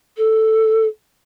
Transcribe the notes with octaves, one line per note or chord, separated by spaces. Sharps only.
A4